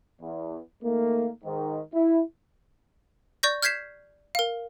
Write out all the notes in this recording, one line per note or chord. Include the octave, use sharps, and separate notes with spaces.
E2
D#3 A3 A#3
G#2 D#3
E4
D5 C#6 G6 A#6
F6 G6 G#6 B6 C7 E7
A#4 F5